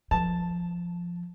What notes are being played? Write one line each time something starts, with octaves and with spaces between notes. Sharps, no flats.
F3 A5